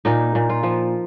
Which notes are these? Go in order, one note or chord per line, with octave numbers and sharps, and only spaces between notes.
A#2 D#4
A#2
F4
F3